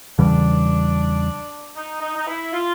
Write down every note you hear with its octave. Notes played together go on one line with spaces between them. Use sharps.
E2 C#3 E3 G3 D4
D#4
D#4
D#4
E4
F4